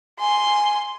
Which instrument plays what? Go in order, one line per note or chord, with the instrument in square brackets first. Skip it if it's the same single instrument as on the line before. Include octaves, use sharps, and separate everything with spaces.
[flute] G#5 [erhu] C6